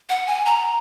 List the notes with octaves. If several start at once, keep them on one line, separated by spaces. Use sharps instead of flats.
F#5
G#5
A#5